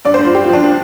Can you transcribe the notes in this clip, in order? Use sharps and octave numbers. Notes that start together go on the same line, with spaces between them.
G2 D5
C5
G2
F4
G2 G4
F4
F3 D4
F3